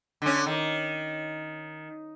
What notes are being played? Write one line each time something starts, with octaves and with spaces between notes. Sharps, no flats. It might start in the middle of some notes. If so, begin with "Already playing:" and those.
D3 C#4
D#3